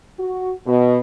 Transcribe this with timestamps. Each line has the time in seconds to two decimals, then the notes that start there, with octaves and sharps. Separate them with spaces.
0.19 F#4
0.67 B2